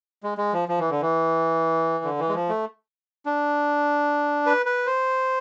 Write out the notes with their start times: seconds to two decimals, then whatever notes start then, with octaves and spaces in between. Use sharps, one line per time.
0.23 G#3
0.38 G#3
0.53 F3
0.69 F3
0.79 E3
0.90 D3
1.01 E3
2.04 D3
2.19 E3
2.29 G#3
2.35 F3
2.49 A3
3.26 D4
4.46 B4
4.66 B4
4.86 C5